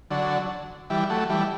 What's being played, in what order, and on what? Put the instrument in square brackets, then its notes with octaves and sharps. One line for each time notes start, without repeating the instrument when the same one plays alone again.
[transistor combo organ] D3 F#3
E3 G3
F#3 A3
E3 G3